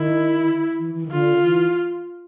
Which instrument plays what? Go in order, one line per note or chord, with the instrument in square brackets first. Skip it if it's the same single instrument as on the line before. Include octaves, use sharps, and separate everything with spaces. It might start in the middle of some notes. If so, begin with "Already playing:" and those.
Already playing: [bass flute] D#3 [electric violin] E4
[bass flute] E3
E3
D#3
[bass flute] D3 [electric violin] F4
[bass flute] E3